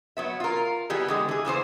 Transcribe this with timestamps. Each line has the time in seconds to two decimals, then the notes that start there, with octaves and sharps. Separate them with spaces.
0.17 F#3 B3 E5
0.40 F4 A#4
0.90 E3 G3 B3 G4 G#4
1.08 D3 G#3 B3
1.29 E3 G#4
1.45 C#3 E3 B3 C5